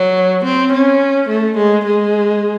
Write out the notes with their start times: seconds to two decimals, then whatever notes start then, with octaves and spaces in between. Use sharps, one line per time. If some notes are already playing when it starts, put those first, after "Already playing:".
Already playing: F#3
0.44 C4
0.72 C#4
1.29 A3
1.57 G#3
1.85 G#3